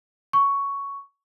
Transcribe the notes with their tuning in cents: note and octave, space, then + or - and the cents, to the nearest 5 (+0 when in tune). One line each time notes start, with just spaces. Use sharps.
C#6 +5